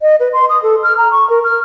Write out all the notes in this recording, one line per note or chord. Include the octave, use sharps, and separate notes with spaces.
D#5
B4
C6
D#6
A4
F6
A#5
C#6
A#4
F6